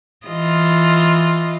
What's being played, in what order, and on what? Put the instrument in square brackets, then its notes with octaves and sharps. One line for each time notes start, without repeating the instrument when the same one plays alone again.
[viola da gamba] E3 F4 D#5